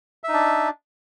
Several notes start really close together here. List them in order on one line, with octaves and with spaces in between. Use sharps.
E5 D#4 D4